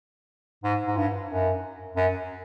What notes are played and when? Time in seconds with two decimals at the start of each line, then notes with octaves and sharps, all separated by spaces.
0.64 G#2
0.87 G#2
0.97 G2
1.30 F#2
1.96 F#2